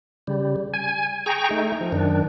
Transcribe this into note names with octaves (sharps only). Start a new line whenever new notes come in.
C#3 G3
G#5
G#4 G5 A#5 C#6
A3 D#4
F3
F#2 D#3 D4